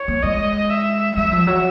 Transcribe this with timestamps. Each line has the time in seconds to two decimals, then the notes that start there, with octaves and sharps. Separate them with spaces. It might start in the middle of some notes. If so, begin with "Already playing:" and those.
Already playing: C#5
0.08 A#3
0.23 G#3 D#5
0.70 E5
1.16 F#3 E5
1.32 F3
1.47 F#3